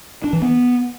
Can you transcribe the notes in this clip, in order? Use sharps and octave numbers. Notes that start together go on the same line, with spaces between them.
D4
E3
B3